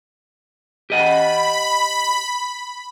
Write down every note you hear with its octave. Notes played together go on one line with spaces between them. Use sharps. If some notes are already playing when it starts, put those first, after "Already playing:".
G4 D#5 F#5 B5